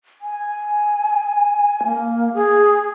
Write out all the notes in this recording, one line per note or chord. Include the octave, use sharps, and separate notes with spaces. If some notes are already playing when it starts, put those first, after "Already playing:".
G#5
A#3
G#4